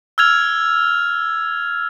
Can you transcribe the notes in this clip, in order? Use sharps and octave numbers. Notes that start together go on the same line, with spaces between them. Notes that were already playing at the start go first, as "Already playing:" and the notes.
E6 F6 G#6 F7